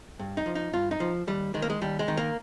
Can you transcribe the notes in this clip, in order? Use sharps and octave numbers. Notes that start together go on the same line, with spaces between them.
G2
D#4
F3
D#4
G2 F4
D#4
F3
D#2 G3
D#3 G#3
A#3
G#3
D#2 G3
G#3
D#3
A#3